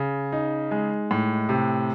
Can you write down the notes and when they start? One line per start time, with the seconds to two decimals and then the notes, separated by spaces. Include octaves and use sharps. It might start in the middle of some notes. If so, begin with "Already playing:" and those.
Already playing: C#3
0.32 D#4
0.71 G#3
1.11 A2
1.49 C3